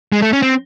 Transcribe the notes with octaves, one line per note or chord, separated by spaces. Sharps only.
G#3
A3
C#4
C4